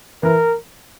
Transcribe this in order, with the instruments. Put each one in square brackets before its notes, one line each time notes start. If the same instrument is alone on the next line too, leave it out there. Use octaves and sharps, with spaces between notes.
[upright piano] E3 [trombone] A#4